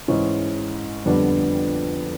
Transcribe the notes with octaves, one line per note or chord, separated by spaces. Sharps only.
G#2 E3 G#3 C#4 E4
F2 D3 G3 B3 D4